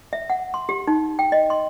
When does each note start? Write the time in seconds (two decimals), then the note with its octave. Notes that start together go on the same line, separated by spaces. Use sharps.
0.13 E5
0.30 F#5
0.54 C6
0.69 G4
0.87 D#4
1.19 G5
1.32 D#5
1.50 C6